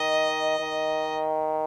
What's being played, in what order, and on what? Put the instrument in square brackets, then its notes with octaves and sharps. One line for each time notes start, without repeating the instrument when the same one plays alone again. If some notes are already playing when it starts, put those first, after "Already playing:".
Already playing: [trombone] D#3 [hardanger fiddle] D#5
[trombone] D#3